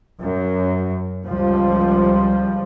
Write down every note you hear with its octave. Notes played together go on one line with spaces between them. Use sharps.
F#2
C#2 F3 G3